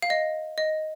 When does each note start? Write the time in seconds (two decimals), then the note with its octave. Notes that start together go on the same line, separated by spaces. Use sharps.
0.02 F5
0.10 D#5
0.58 D#5